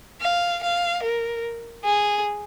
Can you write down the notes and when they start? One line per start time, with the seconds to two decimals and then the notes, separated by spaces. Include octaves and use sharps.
0.21 F5
0.63 F5
1.03 A#4
1.84 G#4